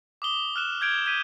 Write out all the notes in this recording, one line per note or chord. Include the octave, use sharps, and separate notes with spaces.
D6 D#6 G7
F6 F#6 E7
G6 G#6 D7
G6 G#6 B6 D#7